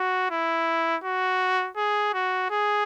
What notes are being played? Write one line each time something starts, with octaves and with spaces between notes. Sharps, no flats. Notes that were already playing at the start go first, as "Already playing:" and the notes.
Already playing: F#4
E4
F#4
G#4
F#4
G#4